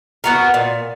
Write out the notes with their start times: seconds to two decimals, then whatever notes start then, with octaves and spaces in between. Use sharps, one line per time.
0.24 B3 F#4 A#4
0.54 A#2